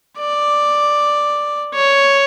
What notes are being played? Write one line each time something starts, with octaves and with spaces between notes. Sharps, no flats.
D5
C#5